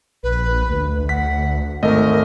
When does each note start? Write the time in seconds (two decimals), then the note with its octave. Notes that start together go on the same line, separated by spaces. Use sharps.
0.23 A#1 B4
0.69 D2
1.09 F#5 B6
1.83 G#1 A3 A#4 D#5